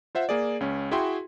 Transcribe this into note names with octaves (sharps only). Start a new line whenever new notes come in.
F4 C5 E5 F#5
A#3 G#4 D5
C#2 C#4
E4 F#4 G#4 E5 G5 C6